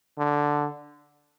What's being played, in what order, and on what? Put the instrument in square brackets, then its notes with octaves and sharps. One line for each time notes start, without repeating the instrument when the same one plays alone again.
[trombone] D3